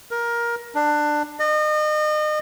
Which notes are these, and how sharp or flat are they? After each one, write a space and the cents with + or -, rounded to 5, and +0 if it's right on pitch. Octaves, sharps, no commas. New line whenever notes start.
A#4 +15
D4 +20
D#5 -35